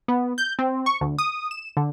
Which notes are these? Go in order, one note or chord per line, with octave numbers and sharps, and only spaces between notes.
B3
G6
C4
C#6
D2
D#6
E7
D3